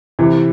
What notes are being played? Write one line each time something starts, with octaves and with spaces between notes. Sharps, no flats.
C3 E3